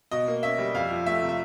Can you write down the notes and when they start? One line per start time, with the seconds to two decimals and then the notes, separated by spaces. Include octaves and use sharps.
0.11 B2 D#5
0.28 A#3
0.43 C#4 E5
0.58 G3
0.74 F2 F5
0.90 F3
1.06 A3 E5
1.21 C3
1.29 E5